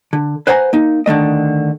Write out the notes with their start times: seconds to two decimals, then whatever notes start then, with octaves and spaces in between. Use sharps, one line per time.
0.13 D3
0.47 B4 C5 F#5 G#5 A#5
0.73 A#3 D#4
1.06 D3 D#3 A3 D#5